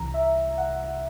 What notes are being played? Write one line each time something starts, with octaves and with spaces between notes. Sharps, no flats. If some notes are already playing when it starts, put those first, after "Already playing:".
Already playing: C2 C3 E3 A#5
E5
F#5